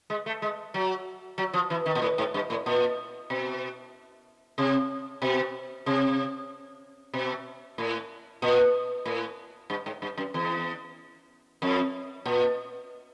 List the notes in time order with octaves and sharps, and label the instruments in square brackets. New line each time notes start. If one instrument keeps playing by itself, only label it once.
[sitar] G#3
A3
G#3
F#3
F#3
F3
E3
D#3
A#2
A2
G#2
G2
A2
A#2
B2
C3
B2
C3
B2
A2
A#2
A2
G2
G#2
G2
F#2
E2
F2
A#2